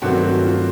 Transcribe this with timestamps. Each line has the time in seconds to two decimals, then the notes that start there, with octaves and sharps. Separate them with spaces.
0.02 G2 D#3 F#3 A3 C4 F#4
0.24 F#4
0.45 F4